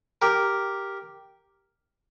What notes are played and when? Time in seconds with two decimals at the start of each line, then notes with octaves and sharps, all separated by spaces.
0.22 G4 A#4